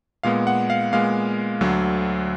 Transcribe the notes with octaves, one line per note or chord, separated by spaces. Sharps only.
A#2 G#3 B3 F5
F#5
F5
A#2 G#3 B3 F5
D2 D3 F#3